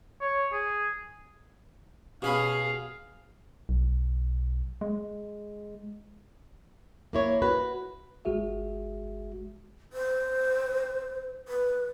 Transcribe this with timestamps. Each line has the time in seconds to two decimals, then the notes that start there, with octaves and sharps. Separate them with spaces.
0.21 C#5
0.52 G#4
2.22 B2 C#4 G#4 F5 B5
3.69 B1
4.81 G#3
7.13 A#3 E4 C#5
7.42 F#4 B4
8.25 G1 G#3 F#4 G#4 E5
9.93 C5
11.48 B4